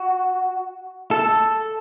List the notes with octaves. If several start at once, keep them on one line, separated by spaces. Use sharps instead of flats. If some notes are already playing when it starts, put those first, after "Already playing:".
Already playing: F#4
A4